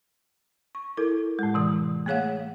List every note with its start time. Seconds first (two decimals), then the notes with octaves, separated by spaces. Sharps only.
0.75 C#6
0.97 E4 A4 A#4
1.39 A2 G#3
1.54 C3 E3 D#6
2.06 A3 A#3 G#4 C#5 F5 F#5